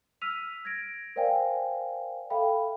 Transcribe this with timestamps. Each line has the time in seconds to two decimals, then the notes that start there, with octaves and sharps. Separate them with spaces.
0.21 E6 F6 B6 D#7 F7
0.65 G#6 A#6 D7
1.16 A#4 C5 D5 F5 G5 G#5
2.30 A4 E5 F5 G5 B5